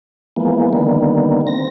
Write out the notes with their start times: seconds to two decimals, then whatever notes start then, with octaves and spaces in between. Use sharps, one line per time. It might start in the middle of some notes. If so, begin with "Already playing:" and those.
0.36 E3 F3 G#3 A#3 B3
0.73 D3 D#3 G3 A#3 B3
1.47 C4 A#6